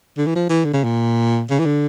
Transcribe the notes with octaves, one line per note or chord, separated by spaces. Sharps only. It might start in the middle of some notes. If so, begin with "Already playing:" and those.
D3
E3
F3
E3
D3
C#3
A#2
C#3
E3
D3